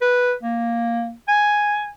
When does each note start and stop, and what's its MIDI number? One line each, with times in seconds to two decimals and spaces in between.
0.02 0.33 71
0.43 1.12 58
1.28 1.88 80